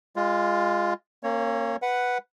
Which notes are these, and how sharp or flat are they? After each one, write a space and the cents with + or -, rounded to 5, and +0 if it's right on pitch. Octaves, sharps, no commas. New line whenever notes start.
G#3 -20 F4 +0
A#3 -15 C#4 -45 C#5 +0
B4 +0 F#5 +0